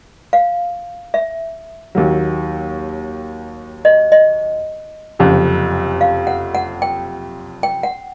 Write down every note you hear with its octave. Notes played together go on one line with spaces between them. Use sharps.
F5
E5
D#2 D#3 F#3
D#5
D#5
F#1 F2 C3
F5
F#5
F#5
G5
G5
F#5